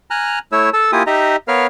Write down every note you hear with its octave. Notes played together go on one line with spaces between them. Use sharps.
G#5 A#5 F6 F#6
A3 E4 C#5 E6
A4 A5 E6
A#3 E4 F4 G4 G#5 D#6
D#4 G4 D#5 E5 A#5
B3 A#4 B4 C#5 F5 F6